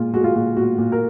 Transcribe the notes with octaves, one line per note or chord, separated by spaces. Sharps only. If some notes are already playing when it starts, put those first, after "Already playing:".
Already playing: A#2 G#3 F4
G#3 F#4
F4
A#2 F#4
A#2 F#4
A#2
A#4